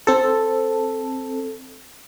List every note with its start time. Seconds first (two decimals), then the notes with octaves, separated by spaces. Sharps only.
0.07 C4 A4